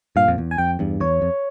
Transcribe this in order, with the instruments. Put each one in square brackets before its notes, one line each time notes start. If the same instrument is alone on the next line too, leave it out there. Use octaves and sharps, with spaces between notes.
[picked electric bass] G2 A#2 [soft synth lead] F5
[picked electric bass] F2
E2
[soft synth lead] G#5
[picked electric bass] F2 [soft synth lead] G5
[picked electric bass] E2 G2
[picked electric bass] E2 [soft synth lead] C#5
[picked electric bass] F2